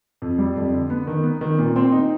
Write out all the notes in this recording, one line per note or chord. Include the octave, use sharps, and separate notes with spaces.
F2
G3
F2
D3
B3
D#3
B3
D#3
A#2
C4
D#4